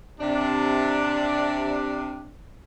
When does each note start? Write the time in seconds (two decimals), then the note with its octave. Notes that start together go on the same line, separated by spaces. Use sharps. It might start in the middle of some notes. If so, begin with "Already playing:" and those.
0.19 C3 D4